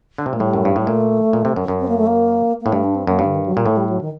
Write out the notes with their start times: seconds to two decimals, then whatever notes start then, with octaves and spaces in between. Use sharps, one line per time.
0.18 D3
0.26 C3
0.33 A#2 A3
0.40 A2 G3
0.53 F#2
0.65 G2
0.76 A2 G3
0.86 A#2 A3
1.33 A#2
1.45 C3
1.56 F#2
1.68 F#2
1.79 C4
1.89 A#3
1.98 A3
2.07 A#3
2.61 A2 A#3
2.72 G2 A3
2.84 D4
2.95 C4
3.07 F#2 A#3
3.19 G2
3.25 D3
3.35 D#3
3.46 F#3
3.55 A#2 G3
3.66 A2 A3
3.77 G3
3.89 F#3
4.01 D#3